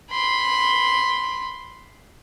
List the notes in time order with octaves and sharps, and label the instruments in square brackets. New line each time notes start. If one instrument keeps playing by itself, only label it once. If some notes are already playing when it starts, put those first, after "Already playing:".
[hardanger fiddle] B5 C6